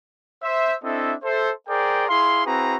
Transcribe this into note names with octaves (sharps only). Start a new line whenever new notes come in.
C5 E5
C4 D4 E4 A4 D#5 E5
A4 C5 E5
G#4 A#4 C5 D5 G5
E4 G#4 F5 C6
C4 E4 F#4 G#4 B4 A#5